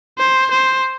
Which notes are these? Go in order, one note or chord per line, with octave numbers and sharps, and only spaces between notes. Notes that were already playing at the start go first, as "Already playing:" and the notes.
C5
C5